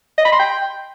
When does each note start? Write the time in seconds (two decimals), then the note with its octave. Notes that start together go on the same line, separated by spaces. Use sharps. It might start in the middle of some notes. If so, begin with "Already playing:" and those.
0.18 D#5
0.25 B5
0.33 C6
0.40 G5